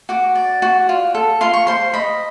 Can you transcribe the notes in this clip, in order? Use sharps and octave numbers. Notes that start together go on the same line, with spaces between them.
F#4 D6
D5
F#4
F4
A4
F4 C6
C#6
C5 C6
D#5 B5